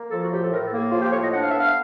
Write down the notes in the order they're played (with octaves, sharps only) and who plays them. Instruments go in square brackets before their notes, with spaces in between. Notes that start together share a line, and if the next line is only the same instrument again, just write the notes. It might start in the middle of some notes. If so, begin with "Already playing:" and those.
Already playing: [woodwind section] A#3
F3 A4
F#4
A2 G4
A4
A2 A#4
A4
A#3
G#4
F3 F4
G4
A2 C#5
D#5
D4 F#5
F5
B3 E5
F5